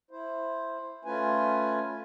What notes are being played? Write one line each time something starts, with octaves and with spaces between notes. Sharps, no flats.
E4 C5
A3 C#4 F4 B4 G#5